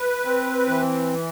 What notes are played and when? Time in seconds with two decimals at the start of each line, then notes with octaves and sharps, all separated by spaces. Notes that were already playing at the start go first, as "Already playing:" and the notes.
Already playing: B4
0.25 C4
0.68 E3